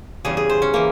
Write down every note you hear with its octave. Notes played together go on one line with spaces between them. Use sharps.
E2 C#3 G3 G#4
G#4
C5
C#4
E3 A#3